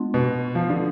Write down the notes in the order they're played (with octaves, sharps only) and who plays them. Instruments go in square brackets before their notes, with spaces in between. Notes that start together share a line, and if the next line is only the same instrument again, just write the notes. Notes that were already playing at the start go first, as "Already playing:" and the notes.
Already playing: [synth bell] G#3 B3 D4 F4
[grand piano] B2
F3
D3